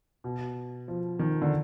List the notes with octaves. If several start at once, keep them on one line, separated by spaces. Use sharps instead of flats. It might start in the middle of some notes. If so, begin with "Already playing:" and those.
B2
F3
D#3
D3